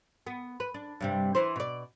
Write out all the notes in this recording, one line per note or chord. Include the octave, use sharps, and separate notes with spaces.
B3
B4
D4
G2 C3 G3
E3 E4 C5
B2 D5